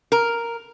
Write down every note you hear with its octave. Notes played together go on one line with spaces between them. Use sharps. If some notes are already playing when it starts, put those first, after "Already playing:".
A#4